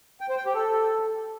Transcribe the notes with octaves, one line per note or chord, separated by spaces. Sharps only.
G5
C5
G5
G4
A4